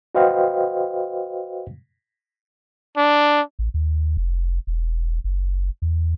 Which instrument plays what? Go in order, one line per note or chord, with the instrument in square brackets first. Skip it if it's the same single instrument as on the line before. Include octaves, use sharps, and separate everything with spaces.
[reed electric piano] F#4 B4 C5 D#5 F5 G5
[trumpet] D4
[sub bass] A1
D#2
F1
E1
F#1
E2